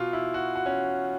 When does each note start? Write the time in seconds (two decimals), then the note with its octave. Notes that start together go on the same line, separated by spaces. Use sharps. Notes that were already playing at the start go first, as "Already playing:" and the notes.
Already playing: B2 F4
0.13 E4
0.34 F#4
0.56 F#4
0.66 C#4